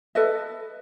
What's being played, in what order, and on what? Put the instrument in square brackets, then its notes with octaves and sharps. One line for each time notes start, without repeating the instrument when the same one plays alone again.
[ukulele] A4 B4 D#5 E5